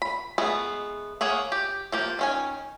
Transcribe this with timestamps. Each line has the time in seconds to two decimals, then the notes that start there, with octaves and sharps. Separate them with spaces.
0.02 B5
0.38 G#3 A3 B3 G#4
1.21 A#3 G#4 C#5 F#5
1.52 G4
1.92 F3 A#3 G4
2.19 D#3 C#4 G#5